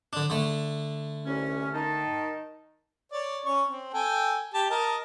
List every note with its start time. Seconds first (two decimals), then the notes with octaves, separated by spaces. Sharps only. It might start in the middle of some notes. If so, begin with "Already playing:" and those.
0.13 D3 D4
0.30 D3 A3
1.26 C2 C#4
1.74 D#3 D#4 A5
3.12 C#5 D5
3.46 C#4 C#5 C#6
3.69 C4
3.94 A4 G5 G#5
4.54 G4 A5
4.70 A#4 D#5 A5